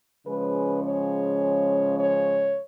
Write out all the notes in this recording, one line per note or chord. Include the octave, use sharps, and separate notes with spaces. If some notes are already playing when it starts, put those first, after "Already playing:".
C#3 F3 G#3 C#4 B4
C#5
C#5